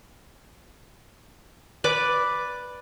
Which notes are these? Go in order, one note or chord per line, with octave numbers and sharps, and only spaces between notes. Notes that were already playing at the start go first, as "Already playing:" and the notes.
B4 D5 D6